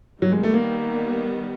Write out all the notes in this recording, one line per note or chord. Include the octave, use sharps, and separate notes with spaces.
D#3 F#3 G3 B3
G#3
A3
A#3